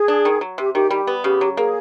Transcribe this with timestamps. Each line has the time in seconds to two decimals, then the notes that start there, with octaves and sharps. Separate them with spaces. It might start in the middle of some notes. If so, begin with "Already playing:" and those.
Already playing: G#4
0.08 D4
0.25 D#3
0.41 F#3
0.58 C3 G4
0.74 D#3 G4
0.90 G3 G4
1.07 B3
1.24 C#3 G4
1.41 F#3
1.57 A#3 G#4